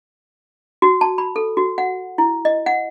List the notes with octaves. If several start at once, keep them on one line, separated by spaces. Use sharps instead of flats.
F#4
A5
B5
A4
F#4
F#5
E4
D#5
F#5